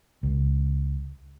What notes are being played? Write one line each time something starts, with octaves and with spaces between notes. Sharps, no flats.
C#2